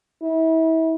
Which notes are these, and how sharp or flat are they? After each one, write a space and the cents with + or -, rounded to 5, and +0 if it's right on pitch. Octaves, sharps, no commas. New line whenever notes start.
E4 -35